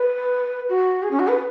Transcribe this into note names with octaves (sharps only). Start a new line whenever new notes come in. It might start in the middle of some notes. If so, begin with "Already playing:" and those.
Already playing: B4
F#4
G#4
C#4
F#4
B4